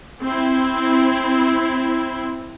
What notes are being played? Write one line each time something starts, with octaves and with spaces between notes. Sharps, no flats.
C4 E4